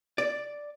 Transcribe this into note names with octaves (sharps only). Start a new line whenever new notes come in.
D5